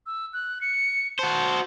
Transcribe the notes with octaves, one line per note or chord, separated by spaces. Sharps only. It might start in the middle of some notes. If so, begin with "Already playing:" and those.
E6
F#6
C#7
F#4 C5 A5